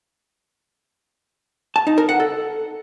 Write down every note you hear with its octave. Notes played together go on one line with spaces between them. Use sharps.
A5
D#4
A#4
F#5
A4